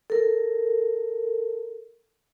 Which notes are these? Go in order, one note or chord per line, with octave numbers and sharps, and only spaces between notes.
A4 A#4